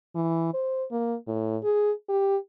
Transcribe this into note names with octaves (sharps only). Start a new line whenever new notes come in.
E3
C5
A#3
A2
G#4
G4